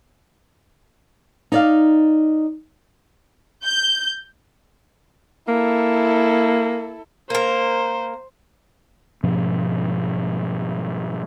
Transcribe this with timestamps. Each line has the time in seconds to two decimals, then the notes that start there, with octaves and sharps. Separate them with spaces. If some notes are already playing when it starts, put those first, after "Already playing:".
1.52 D#4 D5 F5
3.64 G6
5.48 A#3 E4 A4
7.30 A#3 A#4 C5
9.24 G#2 B2 F3 C#4